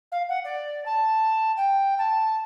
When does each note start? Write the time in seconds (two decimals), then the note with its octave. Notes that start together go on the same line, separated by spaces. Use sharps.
0.12 F5
0.29 F#5
0.44 D5
0.86 A5
1.57 G5
1.98 A5